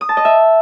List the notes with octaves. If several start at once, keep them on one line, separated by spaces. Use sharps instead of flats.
D#6
A5
D#5
E5